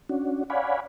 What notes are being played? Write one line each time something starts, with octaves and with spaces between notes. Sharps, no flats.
C#4 D4 F#4
C#5 D5 F5 F#5 G#5 B5